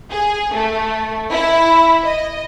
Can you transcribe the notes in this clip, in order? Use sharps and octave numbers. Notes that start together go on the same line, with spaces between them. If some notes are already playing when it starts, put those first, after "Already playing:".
G#4
A3
E4
D#5